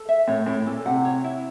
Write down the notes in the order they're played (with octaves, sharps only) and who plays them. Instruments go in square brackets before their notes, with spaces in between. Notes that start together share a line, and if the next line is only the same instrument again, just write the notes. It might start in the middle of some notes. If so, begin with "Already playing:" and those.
Already playing: [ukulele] A4
E5
[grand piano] A2 [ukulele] C#5
[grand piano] A2 [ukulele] E4
[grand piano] A#2 [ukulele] A4
[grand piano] C3 [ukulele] F#5
[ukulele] C#5
E4